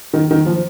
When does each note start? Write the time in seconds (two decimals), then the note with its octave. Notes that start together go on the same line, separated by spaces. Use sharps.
0.13 D#3
0.31 D#3
0.46 F3